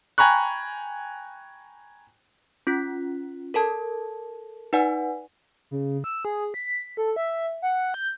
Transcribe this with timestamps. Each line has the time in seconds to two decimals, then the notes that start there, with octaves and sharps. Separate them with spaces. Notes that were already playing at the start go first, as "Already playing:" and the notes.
0.18 G5 G#5 A#5 B5 C#6 F#6
2.67 C#4 F4 F#6 B6
3.54 A4 A#4 A5 G#6
4.73 D#4 B4 D5 F#5 G#5
5.71 C#3
6.04 E6
6.25 G#4
6.54 B6
6.97 A4
7.16 E5
7.62 F#5
7.94 G6